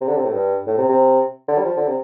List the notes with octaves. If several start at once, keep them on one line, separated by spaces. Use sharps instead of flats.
C3
D3
C3
A2
G2
A2
C3
C3
D3
G3
F3
D3
C3